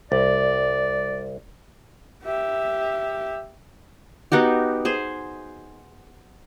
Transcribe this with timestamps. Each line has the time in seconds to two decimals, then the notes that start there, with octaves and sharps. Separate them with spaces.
0.12 C2 D5
2.24 G4 E5
4.32 B3 D#4 F#4 G4
4.85 G#4 C5